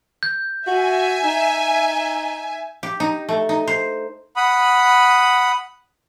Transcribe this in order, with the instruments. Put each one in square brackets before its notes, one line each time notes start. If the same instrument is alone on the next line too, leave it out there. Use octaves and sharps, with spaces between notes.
[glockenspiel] G6
[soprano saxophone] F#4 [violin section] E5 G#5
[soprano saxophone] D#4
[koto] G4
D#4
A3
D#4
C5
[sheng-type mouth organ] F#5 B5 D#6